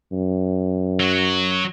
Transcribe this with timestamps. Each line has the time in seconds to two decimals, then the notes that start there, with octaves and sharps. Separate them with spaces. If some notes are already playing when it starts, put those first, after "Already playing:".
0.12 F#2
1.00 F#3 F#4